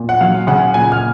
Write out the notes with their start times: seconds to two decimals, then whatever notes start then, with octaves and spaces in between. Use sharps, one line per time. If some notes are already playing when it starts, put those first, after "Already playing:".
Already playing: A#2
0.09 F#5
0.21 F#3 F5
0.47 C#3 F#5
0.74 A#2 G#5
0.92 F6